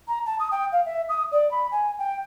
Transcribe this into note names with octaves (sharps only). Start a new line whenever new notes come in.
A#5
A5
D#6
G5
F5
E5
D#6
D5
B5
G#5
G5